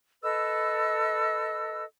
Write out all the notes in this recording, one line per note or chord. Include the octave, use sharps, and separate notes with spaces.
A4 B4 D#5 E6